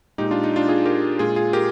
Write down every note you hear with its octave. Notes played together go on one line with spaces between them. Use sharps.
A#2 G#3 D#4 G4
D4 F4
D#4
D4 F4
F4 G#4
G4 A#4
A#2 G#3 F4 G#4
F4 G#4
G4 A#4